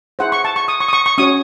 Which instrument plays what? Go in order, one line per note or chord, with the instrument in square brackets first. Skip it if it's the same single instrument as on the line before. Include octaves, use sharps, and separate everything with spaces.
[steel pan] E4 G#4 C5 F#5
C#6
A5
C#6
D#6
C#6
D#6
C#6
C#6
C#4 F#4 C#5 D#6